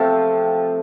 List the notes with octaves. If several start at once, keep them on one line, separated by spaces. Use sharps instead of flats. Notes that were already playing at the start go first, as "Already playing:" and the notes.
Already playing: C3 F3 A3 C4 F4